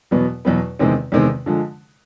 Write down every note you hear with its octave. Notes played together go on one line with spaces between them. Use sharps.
E2 B2 F#3 B3
E2 B2 F#3 B3
E2 C3 D#3 G#3 C4
E2 C3 D#3 G#3 C4
D3 F3 G#3